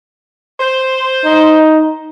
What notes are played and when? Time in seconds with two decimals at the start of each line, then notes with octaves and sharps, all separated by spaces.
0.60 C5
1.24 D#4